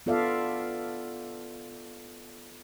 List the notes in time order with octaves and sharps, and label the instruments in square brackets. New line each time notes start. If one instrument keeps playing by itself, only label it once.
[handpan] B3 F4 A4 D5 E5 F5